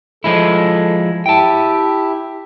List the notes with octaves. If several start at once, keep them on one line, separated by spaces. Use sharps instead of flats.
F3 G#3 E4 A4
E4 G4 E5 G5 A5